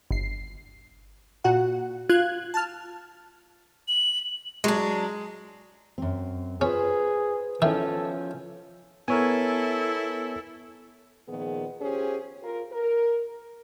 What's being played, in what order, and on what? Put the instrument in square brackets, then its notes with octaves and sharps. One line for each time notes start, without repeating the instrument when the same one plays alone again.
[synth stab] G1 C7
A#2 F#4 F#5
F4 F#6 G#6
A5 F6
[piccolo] F#7
[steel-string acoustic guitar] F#3 D4 [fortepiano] G#3
[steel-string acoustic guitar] F#2 C4
[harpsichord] C#4 [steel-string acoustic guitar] F4 B4 C5 [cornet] G#4
[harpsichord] D#3 E4 [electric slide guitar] F3 C#4 [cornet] A4
[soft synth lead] B3 [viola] E4 A4 [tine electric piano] A#4 C#5 G#5
[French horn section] A#2 D#3 F3 B3 G#4
C#4 F4 G4 G#4 C5
F4 A#4
A#4